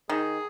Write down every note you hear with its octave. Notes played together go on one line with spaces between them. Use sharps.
D#3 G#4